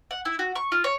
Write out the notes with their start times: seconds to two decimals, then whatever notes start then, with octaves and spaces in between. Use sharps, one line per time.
0.11 F#5
0.25 E4
0.39 F#4
0.55 C#6
0.72 F4
0.84 C#5